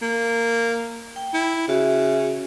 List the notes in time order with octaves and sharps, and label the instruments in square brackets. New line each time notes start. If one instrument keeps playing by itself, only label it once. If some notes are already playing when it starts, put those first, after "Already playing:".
[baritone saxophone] A#3
[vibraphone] G5
[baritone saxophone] E4
[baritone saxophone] C#3 [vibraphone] F#4 E5